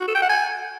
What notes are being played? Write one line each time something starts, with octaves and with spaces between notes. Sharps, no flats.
F#4
A4
G5
F#5
G#5